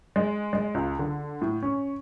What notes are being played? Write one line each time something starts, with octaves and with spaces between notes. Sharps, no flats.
G#3
G#3
C#2
D3
A2
C#4